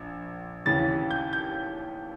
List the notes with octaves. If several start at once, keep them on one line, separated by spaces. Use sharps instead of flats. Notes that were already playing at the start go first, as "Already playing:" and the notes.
Already playing: A#1
D#2 C#3 E3 A6
G6
G6